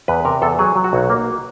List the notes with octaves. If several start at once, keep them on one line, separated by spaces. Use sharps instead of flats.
E2 B4
C3 A#4
E2 A4
F#3 G#4
F#3
F#4
B1
A#3